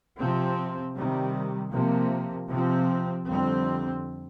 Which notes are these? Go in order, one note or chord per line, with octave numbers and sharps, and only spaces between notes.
C3 F3 C4
C3 D#3 G3
C3 F3 A#3
C3 F3 C4
F2 D3 G3 C4